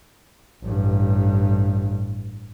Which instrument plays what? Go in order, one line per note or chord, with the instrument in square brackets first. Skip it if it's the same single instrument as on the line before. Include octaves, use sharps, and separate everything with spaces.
[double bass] A1 G2